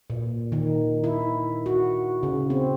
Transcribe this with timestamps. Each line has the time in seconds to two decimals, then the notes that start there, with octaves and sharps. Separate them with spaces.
0.10 A#2
0.52 D#3
1.04 E4
1.66 F#4
2.23 C#3
2.50 C4